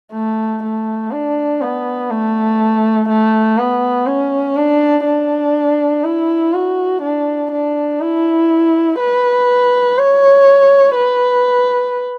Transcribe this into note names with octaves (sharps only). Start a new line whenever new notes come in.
A3
A3
D4
B3
A3
A3
B3
C#4
D4
D4
E4
F#4
D4
D4
E4
B4
C#5
B4